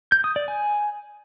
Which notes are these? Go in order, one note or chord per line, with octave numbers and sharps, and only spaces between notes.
G6
D#6
D5
G#5